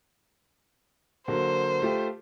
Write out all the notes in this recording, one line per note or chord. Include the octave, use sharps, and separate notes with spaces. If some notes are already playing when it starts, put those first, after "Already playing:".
D3 F#3 A#3 C5
A3 F4 G4